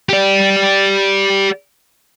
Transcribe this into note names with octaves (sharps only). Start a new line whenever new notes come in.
G4 D5